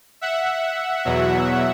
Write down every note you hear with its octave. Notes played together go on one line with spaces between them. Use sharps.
E5 F#5
E2 B2 F#3